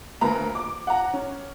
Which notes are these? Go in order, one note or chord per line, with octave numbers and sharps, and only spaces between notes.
D2 A#3 B4 A#5 B5
D6
F#5 A#5
C#4